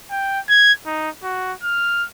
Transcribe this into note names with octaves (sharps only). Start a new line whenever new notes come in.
G5
G#6
D#4
F#4
F6